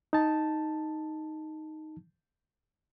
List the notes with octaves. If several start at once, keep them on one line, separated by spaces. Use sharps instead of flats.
D#4 A5